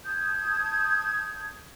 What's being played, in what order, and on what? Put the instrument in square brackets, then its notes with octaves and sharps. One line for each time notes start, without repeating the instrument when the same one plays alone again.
[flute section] A5 D#6 G6 G#6